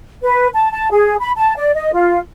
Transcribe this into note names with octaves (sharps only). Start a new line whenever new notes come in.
B4
A5
A5
G#4
B5
A5
D5
D#5
F4